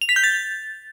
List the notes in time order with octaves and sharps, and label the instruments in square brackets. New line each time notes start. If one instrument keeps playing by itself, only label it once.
[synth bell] F7
B6
G6
A6